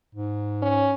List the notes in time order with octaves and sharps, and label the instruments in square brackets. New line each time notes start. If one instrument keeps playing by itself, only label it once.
[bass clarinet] G#2
[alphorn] C#4